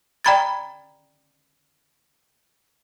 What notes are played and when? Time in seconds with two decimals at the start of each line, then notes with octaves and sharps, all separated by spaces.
0.25 D5 G5 A#5 B5 G#6 A6